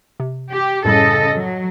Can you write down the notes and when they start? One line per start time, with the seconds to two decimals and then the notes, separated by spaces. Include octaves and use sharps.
0.20 C3
0.51 G4
0.85 F#2 A2 C#3 G3 A4 D#5
1.34 F#3